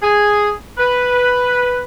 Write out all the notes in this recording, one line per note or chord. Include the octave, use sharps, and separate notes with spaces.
G#4
B4